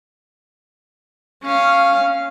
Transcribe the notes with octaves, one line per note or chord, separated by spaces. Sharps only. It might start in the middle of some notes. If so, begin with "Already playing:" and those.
C#4 F5